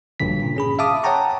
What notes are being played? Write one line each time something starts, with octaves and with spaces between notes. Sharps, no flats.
A#1 G2 A#2 D3 B6
A#2 C#3
C#4 G#4 B5
E5 F5 A5 D6 D#6
C#5 F#5 G5 A5 A#5 C#6